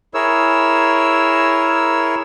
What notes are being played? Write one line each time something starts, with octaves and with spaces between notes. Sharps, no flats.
E4 G#4 A#4 C#5 E6